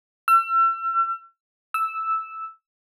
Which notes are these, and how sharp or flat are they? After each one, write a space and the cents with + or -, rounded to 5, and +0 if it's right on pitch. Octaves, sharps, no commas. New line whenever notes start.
E6 +40
E6 -5